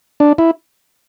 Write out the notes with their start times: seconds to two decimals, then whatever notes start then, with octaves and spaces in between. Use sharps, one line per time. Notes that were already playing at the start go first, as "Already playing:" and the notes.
0.20 D4
0.38 E4